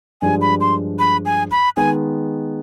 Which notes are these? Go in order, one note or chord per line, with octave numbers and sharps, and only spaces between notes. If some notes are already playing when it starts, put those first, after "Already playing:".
G2 F3 G#3 D4 G4 G#5
B5
C6
B5
G#5
B5
D#3 G#3 B3 G#5